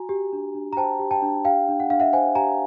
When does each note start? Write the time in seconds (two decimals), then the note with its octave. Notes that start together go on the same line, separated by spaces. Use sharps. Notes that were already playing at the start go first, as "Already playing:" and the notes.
Already playing: F#4 G#5 A#5
0.09 G4
0.33 D4
0.55 D4
0.73 A#5
0.77 C5 G5 A5
0.99 G4
1.11 G5 A5
1.22 D4
1.45 G4 F5 G5
1.68 D4
1.80 F#5
1.90 D4 F5
2.00 E5 F#5
2.13 C5 F#5 G#5
2.35 G4 G#5 A#5